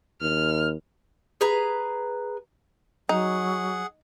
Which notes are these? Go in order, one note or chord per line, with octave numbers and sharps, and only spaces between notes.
D#2 F6
G#4 B4 A#5
F#3 D#4 G#4 F#5